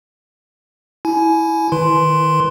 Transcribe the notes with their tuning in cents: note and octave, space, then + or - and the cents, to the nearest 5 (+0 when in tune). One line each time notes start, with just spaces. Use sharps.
E4 -10 G#5 +25
D#3 +0 B4 +10 C6 +0